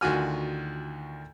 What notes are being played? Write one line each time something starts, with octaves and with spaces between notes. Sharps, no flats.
D2 D#3 F4 F#4 G#5 F6